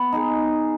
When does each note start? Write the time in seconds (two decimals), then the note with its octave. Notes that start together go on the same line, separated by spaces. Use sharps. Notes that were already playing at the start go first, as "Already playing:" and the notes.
Already playing: B3
0.12 D#4 G#4